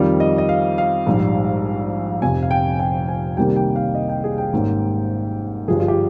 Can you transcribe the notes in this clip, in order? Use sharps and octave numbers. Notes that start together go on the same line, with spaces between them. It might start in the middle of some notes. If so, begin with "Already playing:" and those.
Already playing: F2 D#3 G3 C4 F4
D#5
D#5
F5
F5
A#1 G#2 G3
F1 F2 C3 G#5
F5
G5
G5
G#5
C2 C3 D#3 G3 A#3 G5
G5
F5
D#5
G5
G#4
G5
G#1 G#2 G3 A#3 C#4
G1 G2 F3 G#4
F4
G4